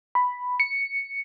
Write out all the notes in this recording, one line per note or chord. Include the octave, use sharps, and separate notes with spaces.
B5
C#7